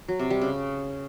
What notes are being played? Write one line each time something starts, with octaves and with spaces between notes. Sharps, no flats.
F#3
C3
G3
C#3